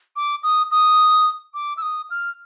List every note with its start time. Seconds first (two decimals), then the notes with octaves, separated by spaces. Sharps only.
0.16 D6
0.43 D#6
0.71 D#6
1.54 D6
1.77 E6
1.82 D#6
2.10 F6